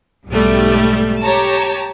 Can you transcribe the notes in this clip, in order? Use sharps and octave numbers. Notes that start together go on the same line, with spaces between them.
B1 G#2 G3 A3
G4 C#5 A5 A#5